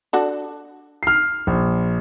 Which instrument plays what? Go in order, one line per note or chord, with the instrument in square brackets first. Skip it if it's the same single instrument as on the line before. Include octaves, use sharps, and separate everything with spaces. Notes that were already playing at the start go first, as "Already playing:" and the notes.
[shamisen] D4 F#4 A4
[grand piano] F6 C7
A#1